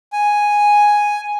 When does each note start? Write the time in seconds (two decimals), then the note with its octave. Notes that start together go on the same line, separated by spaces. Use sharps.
0.13 G#5